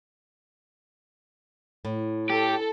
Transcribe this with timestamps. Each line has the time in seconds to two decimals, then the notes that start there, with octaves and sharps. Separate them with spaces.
1.85 A2
2.30 G4 A4